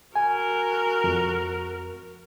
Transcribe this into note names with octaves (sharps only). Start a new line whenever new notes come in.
F#4 A#4 G#5
F2